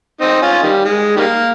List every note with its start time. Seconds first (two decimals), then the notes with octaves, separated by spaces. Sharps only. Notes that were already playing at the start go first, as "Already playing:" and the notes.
0.21 C4 D#4
0.42 C#4 F4
0.63 D#3 G3
0.85 G#3
1.16 D#3 G3 A#3